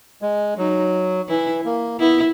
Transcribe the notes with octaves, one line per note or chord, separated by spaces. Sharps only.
G#3
F#3 D#4
E3 E4
A#3
B3 E4